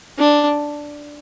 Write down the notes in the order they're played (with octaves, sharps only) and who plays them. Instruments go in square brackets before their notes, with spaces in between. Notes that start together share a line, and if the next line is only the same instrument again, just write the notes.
[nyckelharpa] D4